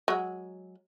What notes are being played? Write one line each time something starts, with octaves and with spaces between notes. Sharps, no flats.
F#3 G#3